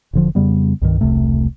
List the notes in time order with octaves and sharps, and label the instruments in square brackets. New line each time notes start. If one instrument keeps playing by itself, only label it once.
[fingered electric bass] E1 D3 F3
F2 C#3 G3 B3
C2 G2 D#3
E1 C2 C3 A3